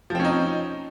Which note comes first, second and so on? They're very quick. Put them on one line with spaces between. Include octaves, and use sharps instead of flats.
F3 C4 C#4 D#4